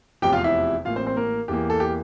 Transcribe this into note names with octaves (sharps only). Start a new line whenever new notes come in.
F1 E2 C3 F3 G4 G5
F4 F5
E4 E5
A1 A2 E3 A#3 F4 F5
C4 C5
C4 C5
A#3 A#4
E2 E3 A#3 G4
A4
G4